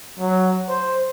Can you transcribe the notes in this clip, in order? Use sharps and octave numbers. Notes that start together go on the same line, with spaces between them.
F#3
C5